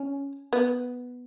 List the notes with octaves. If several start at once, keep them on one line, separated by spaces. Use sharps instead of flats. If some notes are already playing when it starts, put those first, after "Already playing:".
Already playing: C#4
B3